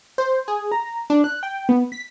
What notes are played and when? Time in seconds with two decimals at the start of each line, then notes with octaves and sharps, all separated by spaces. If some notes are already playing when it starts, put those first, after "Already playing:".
0.18 C5
0.48 G#4
0.72 A#5
1.10 D4
1.24 F#6
1.43 G5
1.69 B3
1.92 B6